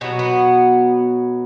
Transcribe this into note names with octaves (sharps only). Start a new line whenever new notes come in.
B2 F#3 B3
B3